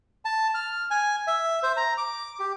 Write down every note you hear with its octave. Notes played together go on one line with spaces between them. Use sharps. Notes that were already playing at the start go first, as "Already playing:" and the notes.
A5
F6
G#5
E5
C5
A#5
D6
G4